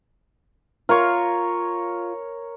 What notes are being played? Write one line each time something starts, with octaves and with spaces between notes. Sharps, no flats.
F4 A#4 C#5